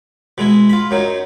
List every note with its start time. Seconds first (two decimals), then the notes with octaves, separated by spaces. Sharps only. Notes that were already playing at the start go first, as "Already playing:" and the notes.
0.38 B2 G#3 E4
0.70 F4 B5
0.91 F#2 F#3 D#4